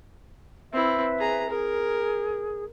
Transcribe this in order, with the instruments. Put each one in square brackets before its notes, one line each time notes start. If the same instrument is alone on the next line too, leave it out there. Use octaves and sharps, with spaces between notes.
[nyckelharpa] C4 E4 [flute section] B4 E5
[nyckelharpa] G#4 A#5
[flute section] G#4 [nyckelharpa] A#4